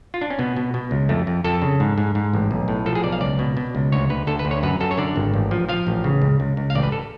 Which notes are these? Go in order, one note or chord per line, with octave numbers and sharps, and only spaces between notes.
F4
D4
C#4
B2 B3
B2
B2
C#2
F2 A3
F2
F2 A4
C#3
G#2
G#2
G#2
A1
B1
A2
F3 A4
G#4
B1 D5
F5
C#2 D5
B2
B2
C#2
D2 C#5
D2 B4
D2 A4
B4
D2
C#5
F#2 B4
F#2 A4
C#5
D3 D5
G#1
A1
F3
F3 F5
A1
C#3
C#2
C#2
C#2
F5
A1 D5
B4
A4